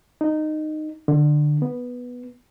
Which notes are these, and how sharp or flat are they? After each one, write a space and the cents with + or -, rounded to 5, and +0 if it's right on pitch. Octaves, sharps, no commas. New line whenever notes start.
D#4 -15
D3 +20
B3 -5